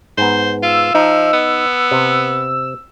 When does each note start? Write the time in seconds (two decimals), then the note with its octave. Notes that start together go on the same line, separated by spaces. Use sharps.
0.18 G#2 B3 C5
0.63 F4 E6
0.94 F3 D#4
1.33 B3
1.91 C3